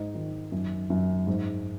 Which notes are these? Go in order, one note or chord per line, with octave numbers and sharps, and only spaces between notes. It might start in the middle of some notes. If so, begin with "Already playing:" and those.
Already playing: G#2 D#4
D#3
F#2
F#2
G#2